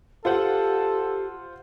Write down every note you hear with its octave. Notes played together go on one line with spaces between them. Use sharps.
F4 G4 A4 C5 F#5